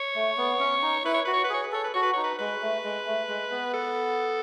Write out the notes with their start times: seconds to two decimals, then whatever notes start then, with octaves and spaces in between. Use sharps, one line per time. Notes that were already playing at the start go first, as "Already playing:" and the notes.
Already playing: C#5
0.15 A3
0.37 B3
0.60 C#4
0.82 D#4
1.04 E4 B4
1.14 C#5
1.25 F#4 B4
1.34 C#5
1.44 B4
1.50 G#4 C#5
1.63 B4
1.72 A4 C#5
1.84 B4
1.93 F#4 C#5
2.03 B4
2.13 D#4 C#5
2.24 B4
2.39 G#3 B4
2.62 A3
2.84 G#3
3.07 A3
3.29 G#3
3.51 B3
3.73 A4